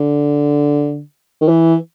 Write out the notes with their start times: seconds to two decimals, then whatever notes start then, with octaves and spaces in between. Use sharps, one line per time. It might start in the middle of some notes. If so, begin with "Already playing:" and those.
Already playing: D3
1.41 D#3
1.48 E3